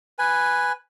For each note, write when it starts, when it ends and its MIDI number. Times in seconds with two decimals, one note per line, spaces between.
0.19 0.72 71
0.19 0.72 80